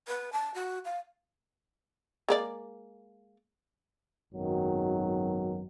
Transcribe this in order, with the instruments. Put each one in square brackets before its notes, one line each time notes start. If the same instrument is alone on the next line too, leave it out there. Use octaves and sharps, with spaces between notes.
[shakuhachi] B4
A5
F#4
F5
[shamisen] G#3 A#3 D5
[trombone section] G#1 F#2 B2 D#3 F#3